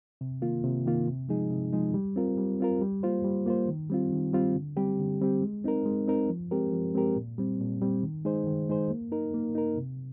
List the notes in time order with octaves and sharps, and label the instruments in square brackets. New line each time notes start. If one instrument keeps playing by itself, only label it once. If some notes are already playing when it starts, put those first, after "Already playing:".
[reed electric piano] C3
D#3 A#3 F4
C3
D#3 A#3 F4
C3
F3 G#3 D#4 G#4
C3
F3 G#3 D#4 G#4
G3
C4 F4 A#4
G3
C4 F4 A#4
G3
A#3 F4 C5
G3
A#3 F4 C5
D#3
G3 C4 F4
D#3
G3 C4 F4
D3
G3 C4 G4
D3
G3 C4 G4
G#3
C4 D#4 A#4
G#3
C4 D#4 A#4
F3
G#3 C4 G4 A#4
F3
G#3 C4 G4 A#4
A#2
G3 C4
A#2
G3 C4
D#3
G#3 D#4 G#4 C5
D#3
G#3 D#4 G#4 C5
A#3
D#4 A#4
A#3
D#4 A#4
C3